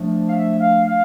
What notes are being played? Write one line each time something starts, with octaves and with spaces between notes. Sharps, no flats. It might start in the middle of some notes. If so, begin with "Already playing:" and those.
Already playing: F3 A3 D4
F5
E5
F5
F5